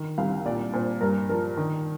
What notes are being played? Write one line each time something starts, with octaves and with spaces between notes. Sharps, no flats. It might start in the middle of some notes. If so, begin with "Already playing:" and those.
Already playing: D#3
C2 F5
A#2 D5
A#2 C5
G2 A#4
F3 A#4
D#3